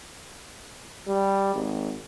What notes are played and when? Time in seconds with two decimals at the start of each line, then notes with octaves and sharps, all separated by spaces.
1.07 G3
1.54 G#1